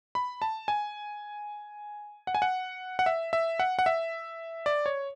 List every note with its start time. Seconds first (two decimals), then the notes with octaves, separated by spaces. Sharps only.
0.15 B5
0.42 A5
0.68 G#5
2.27 F#5
2.35 G#5
2.42 F#5
2.99 F#5
3.06 E5
3.33 E5
3.59 F#5
3.79 F#5
3.86 E5
4.66 D5
4.86 C#5